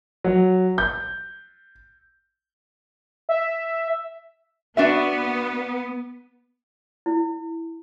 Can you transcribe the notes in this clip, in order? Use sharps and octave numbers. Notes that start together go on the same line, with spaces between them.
F#3
G6
E5
B3 D4 F#4 E5
E4